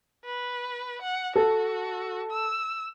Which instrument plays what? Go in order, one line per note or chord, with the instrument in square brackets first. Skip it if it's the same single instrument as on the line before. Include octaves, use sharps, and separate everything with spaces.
[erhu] B4
F#5
[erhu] F#4 [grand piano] A4
[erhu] E6